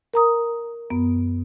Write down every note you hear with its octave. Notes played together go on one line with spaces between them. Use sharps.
A#4 A#5 D#6
F#2 B3